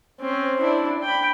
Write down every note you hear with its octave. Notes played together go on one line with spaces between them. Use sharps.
C4 C#4
D4 E4
G5 B5